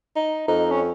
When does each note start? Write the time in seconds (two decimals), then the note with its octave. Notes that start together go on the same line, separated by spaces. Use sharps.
0.16 D#4
0.48 F2 D#4
0.71 C#4